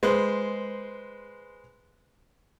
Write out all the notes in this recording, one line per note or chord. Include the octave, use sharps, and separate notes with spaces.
G#3 B4 C5